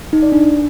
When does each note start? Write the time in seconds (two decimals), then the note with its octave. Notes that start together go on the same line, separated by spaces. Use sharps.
0.13 D#4
0.23 D5
0.32 D4